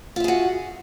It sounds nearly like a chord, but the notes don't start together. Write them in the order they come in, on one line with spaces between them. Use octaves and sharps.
F4 E5 G#4 F#4